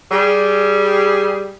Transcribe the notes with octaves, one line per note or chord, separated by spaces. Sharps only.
G3 G#4